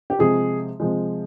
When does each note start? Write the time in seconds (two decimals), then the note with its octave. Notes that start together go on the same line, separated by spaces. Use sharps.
0.10 G4
0.19 C3 F3 G#3 G#4
0.80 C3 F3 G#3